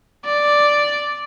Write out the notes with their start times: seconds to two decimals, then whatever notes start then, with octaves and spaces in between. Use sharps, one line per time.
0.25 D5